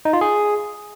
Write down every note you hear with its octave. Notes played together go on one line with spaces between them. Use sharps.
D#4
F4
G#4